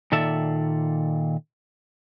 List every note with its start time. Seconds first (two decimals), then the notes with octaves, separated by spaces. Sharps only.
0.12 A#2 D#3 A4 D5 E5